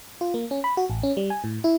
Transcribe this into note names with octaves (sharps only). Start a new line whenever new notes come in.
F4
A#3
C#4
B5
F#4
A1
C#4
G3
G#5
A2
E4